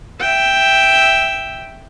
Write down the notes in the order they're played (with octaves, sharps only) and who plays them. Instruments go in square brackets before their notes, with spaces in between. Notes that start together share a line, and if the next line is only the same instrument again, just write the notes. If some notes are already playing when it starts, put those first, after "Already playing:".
[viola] E5 G5